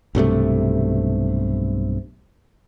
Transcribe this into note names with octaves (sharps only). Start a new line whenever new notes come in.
B1 G2 C3 A3